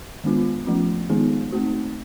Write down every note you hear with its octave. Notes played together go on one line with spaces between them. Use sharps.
D#3 G#3 B3 D4 F4
F3 A3 C#4 F4
D#3 G#3 B3 D#4 G#4
A3 C4 D#4 F#4